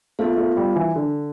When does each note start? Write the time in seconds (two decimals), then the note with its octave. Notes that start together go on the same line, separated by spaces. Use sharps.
0.19 A3 B3 F4 C5 F5
0.37 A3
0.57 G3
0.76 E3
0.96 D3